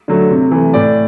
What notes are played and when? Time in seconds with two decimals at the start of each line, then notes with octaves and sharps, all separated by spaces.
0.08 D3 F#3 A3
0.31 C3
0.52 E3 A3
0.74 A2 D5